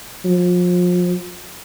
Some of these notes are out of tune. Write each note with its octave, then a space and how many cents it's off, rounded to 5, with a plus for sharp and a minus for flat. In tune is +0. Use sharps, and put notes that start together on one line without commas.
F3 +35